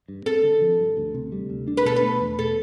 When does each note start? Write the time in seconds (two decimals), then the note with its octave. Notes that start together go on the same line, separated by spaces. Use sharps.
0.08 G2
0.26 C4 A4
0.43 D3
0.61 F3
0.79 G2
0.97 D2
1.14 C3
1.32 G3
1.50 D2
1.68 D4
1.77 B4
1.85 B2 A4
1.96 B4
2.03 A3
2.21 E2
2.38 B2 A4